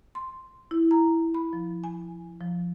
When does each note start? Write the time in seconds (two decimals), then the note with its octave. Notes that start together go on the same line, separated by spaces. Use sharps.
0.15 C6
0.71 E4
0.91 A#5
1.34 B5
1.53 F3
1.84 G#5
2.40 F3